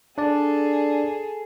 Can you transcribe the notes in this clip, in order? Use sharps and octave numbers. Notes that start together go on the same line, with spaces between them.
D4 G#4 A4 D5